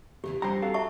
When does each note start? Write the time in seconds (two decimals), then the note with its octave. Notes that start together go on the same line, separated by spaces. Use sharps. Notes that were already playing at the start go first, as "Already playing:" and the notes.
0.24 E2 C#3 E3 G4
0.42 F2 G3 D4 G4 C5 G5 A#5
0.62 F#4 A4 F5
0.74 E5 A5 C#6